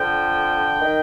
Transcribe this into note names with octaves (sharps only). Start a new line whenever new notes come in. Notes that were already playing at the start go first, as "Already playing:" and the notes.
Already playing: F2 D3 F3 G5
D#3